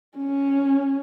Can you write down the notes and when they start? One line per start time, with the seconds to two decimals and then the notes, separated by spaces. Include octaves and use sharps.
0.18 C#4